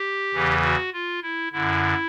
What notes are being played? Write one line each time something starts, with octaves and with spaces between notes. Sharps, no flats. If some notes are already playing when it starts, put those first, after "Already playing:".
Already playing: G4
E2 C#3 E3
F#4
F4
E4
F#2 D3 E4